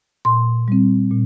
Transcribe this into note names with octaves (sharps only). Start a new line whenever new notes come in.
A#2 C6
G3 C4
A#2